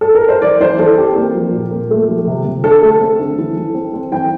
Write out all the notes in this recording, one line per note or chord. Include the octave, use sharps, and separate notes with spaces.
A4
A#4
C5
E3 D5
E3 C5
E3 A4
C4 G4
A#3
F3
A#2
A#3
A3
F3
C3
C3
D3 A4
A3
C4
D3
E3
E3
C4
C4
E3 G5